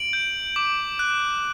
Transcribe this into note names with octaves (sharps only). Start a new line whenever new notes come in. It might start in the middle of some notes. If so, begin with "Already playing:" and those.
Already playing: D7 F#7
G6
D6
F#6